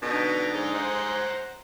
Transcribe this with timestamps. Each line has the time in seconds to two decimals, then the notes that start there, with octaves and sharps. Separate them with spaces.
0.02 B2 D3 D#4
0.55 G#2
0.74 C5 F#5 A#5